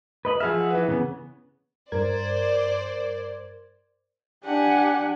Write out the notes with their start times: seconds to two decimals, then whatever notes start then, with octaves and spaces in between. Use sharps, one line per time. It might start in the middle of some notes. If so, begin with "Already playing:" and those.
0.25 B4 D#5 B5
0.40 F3 G#4 E5 F#5 F6
0.70 E3 B4
0.88 C#3 B3
1.92 G2 A#4 C5 D5 G#6
4.45 D4 G4 F#5 G#5